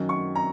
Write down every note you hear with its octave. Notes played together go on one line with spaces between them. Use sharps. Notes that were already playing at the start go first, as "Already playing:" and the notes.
Already playing: F#2 D#3 F#3
C#6
A#5